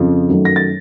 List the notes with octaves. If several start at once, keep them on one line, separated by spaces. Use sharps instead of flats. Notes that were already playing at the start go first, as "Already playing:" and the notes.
Already playing: F2 C#3 F3
F#2 D#3 F#3 A3
A#6
A6